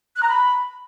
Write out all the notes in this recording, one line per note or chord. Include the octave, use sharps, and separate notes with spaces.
F#6
A#5
B5